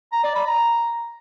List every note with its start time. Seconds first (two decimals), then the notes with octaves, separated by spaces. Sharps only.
0.12 A#5
0.24 D5
0.35 B5
0.47 A#5